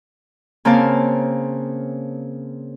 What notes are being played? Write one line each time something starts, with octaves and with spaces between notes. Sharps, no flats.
C#3 A#3 C4 A#4 F5 A5